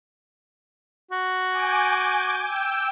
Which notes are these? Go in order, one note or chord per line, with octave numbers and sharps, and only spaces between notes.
F#4
G#5 D6 G6
G5 E6